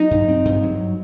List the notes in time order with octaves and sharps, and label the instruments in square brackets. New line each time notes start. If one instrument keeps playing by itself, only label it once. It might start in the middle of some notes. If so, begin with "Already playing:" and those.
Already playing: [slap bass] F#3 [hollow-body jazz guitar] D#4
[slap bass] G2
C4
G2
F#3